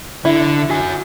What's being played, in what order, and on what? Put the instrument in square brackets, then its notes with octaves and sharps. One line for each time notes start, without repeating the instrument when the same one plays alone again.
[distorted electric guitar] D3 [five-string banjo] E4
[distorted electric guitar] F#4 G#5